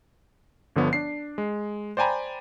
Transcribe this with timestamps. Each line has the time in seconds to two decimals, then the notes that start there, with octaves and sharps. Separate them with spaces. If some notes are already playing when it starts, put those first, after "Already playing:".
0.76 G1 D3 F3 B3 C#5
0.93 D4 C7
1.38 G#3
1.97 C5 D5 G5 G#5 A#5 B5